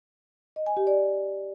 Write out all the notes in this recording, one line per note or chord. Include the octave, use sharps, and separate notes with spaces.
D#5
G#5
G4
D5